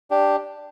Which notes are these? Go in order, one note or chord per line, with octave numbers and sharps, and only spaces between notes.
D4 G4